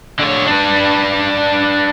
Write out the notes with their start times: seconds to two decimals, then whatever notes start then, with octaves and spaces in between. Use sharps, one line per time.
0.19 D3 C#5
0.46 D4 B4